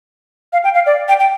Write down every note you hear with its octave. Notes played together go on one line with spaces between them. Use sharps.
F5
G5
F5
D5
G5
G5